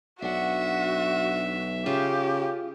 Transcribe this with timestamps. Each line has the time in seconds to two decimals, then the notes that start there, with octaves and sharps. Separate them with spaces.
0.22 B1 D4 F#4 E5 F#5
1.86 C#3 F4 G4